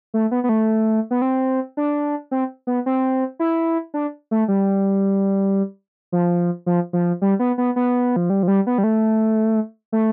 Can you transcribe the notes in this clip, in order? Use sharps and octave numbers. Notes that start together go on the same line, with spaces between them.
A3
B3
B3
A3
B3
C4
D4
C4
B3
C4
E4
D4
A3
G3
F3
F3
F3
G3
B3
B3
B3
F3
G3
F3
G3
B3
G3
A3
A3